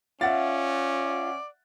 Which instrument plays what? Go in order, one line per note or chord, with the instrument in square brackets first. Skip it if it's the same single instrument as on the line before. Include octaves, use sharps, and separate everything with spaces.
[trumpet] C#4 [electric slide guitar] F4 [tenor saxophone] D5 [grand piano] E5 F#5 A6